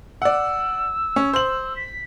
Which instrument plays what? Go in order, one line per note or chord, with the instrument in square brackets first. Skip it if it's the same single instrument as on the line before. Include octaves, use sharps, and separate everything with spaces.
[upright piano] D5 F#5 [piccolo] E6
[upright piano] C#4
C5 F#7
[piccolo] B6